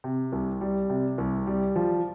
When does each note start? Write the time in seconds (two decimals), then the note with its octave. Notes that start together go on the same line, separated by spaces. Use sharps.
0.04 C3
0.32 C2
0.61 G3
0.90 C3
1.18 C2
1.47 G3
1.76 F3